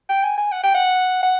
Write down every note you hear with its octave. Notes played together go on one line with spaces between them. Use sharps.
G5
G#5
G#5
F#5
G5
F#5
F#5